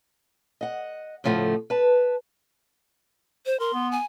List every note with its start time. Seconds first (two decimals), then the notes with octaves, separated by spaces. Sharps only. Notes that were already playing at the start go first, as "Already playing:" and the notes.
0.61 D#5 F#5
1.24 A2 C#3 F3 A3 F#5
1.70 B4 A5
3.46 C5
3.60 A#4 C6
3.73 B3
3.92 G#5